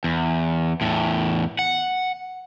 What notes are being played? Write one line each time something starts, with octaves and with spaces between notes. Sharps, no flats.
E2
E2 A2
F#5